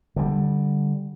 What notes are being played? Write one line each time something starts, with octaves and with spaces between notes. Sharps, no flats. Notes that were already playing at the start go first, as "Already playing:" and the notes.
D3 G3